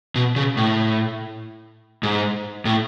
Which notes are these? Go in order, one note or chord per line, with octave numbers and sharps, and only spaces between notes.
B2
C#3
A2
G#2
A2